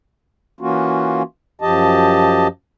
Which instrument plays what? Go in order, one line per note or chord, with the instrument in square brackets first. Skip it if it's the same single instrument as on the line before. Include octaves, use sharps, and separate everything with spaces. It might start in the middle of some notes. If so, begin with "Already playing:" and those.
[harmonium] E3 A#3 C#4 F4 F#4
F#2 F3 G4 D#5 A5